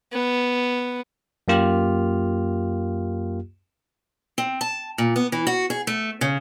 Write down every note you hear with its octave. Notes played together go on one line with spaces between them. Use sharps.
B3
F#2 A#3 F4 G4 F6
C4
A5
A#2
B3
E3
F#4
G#4
A3
C#3